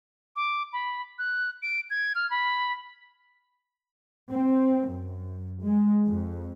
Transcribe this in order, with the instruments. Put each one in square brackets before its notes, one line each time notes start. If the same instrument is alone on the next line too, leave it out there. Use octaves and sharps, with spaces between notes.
[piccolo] D6
B5
F#6
D7
G#6
F6
B5
[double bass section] C4
F#2
G#3
F2